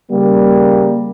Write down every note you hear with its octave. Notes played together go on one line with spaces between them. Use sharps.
C#3 G3 A#3